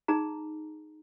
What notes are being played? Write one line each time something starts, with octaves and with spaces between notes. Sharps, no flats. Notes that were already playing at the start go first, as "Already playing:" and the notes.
D#4 G#4 A#5